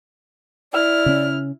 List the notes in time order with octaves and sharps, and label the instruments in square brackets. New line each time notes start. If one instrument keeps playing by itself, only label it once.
[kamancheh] E4 F6 [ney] D5
[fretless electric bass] C#3 C#4